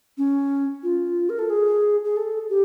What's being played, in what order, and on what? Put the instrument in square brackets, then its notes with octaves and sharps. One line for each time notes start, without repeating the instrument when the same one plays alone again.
[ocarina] C#4
F4
A#4
A4
G#4
G#4
A4
G4